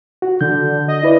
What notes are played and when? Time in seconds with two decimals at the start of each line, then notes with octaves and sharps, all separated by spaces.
0.22 F#4
0.41 D3 G6
0.88 D#5
1.03 E4 B4 D5